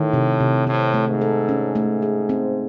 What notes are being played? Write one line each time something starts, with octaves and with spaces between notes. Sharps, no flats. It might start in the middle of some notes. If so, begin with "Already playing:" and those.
Already playing: A2 D#3
C3
C3
A2 C4
A3
G#2
A4
C#4
A3
G#4
C4